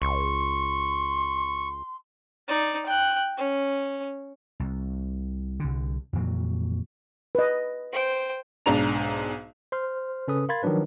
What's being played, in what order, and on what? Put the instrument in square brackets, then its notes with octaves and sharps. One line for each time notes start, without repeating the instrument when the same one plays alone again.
[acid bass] C#2 [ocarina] C6 [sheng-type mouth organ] C#6
[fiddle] D#4 D5
G5 F#6
C#4
[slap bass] C2
C2 D3
F2 A#2 E3 F#3
[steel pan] B4 D#5
[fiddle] C5 G5
[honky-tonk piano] B1 G#2 D4 A#5 F7
[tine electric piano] C5 C6 F6
C#3 C#4 A4 B4 D#6
A#4 F5 B5 C6 G#6 A6
D#3 F3 F#3 D4 B4